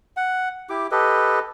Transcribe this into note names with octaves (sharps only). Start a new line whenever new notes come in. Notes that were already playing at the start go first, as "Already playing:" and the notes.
F#5
E4 G4 D6
G4 A4 B4 D#5